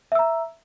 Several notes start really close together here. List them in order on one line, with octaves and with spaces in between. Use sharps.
E5 E6 A#5